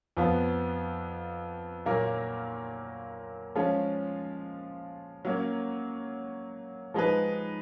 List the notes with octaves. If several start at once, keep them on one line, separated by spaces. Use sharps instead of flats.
F2 F3 B3 F4
A#2 F#3 A#3 F4 A#4
F3 G#3 C#4 F4
F#3 A#3 C#4
F3 G#3 D#4 G#4 B4